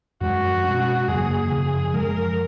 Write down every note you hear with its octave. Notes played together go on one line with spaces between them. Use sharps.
F#2 F3 G#3 C#4 F#4
B2 G#3 C#4
F#2 C#3 F#3 A#3 G#4
F#2 C#3 F3
F#2 F3 G#3 A#4